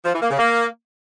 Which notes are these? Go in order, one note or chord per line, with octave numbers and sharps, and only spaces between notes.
F3
E3
A#3
C#3
A#3